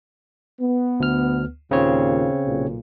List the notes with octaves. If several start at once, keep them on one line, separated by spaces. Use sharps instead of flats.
B3
D2 F6
D#2 A#2 C#3 C4 C#5
B1 A#2